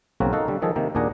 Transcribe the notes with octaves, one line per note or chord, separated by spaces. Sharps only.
B1 C#3 A#3 C4 F#4 A#4
D#4 F#4 A4 A#4 F5 F#5
D3 G3
D#3 F3 G#4 A4
C3 D#3 A#3
D#2 A#2 D4 G#4 F#5 A#5